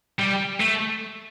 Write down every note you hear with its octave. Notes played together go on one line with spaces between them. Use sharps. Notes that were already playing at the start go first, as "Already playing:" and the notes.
G3
A3